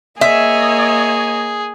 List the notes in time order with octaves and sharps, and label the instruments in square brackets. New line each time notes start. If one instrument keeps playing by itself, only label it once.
[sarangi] A#3 [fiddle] G#4 [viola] C#5 D#5 [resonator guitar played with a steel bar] E5